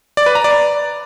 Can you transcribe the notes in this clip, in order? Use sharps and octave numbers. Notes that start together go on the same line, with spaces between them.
D5
B4
A#5
D5